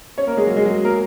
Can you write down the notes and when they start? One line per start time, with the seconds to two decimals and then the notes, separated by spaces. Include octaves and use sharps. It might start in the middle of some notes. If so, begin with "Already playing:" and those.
0.18 C#4 C#5
0.27 A#3 A#4
0.37 G#3 G#4
0.46 F#3 F#4
0.56 G#3 G#4
0.65 F#3 F#4
0.85 A#3 A#4